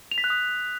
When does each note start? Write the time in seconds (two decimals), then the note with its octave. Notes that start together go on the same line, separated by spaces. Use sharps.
0.11 F7
0.18 B6
0.24 F#6
0.30 D#6